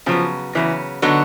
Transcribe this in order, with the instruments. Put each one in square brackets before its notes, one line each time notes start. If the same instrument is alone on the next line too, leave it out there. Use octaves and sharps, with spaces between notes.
[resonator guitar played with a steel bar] C#3 F#3 B3 [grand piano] F3
[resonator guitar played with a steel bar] C#3 F#3 B3 [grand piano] E3
[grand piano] D3 [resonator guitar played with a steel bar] F#3 B3 D#4 F#4